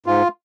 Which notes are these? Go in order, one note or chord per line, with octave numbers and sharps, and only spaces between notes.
G#2 F4